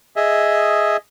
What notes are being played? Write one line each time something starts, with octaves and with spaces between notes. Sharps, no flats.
G#4 D#5 E5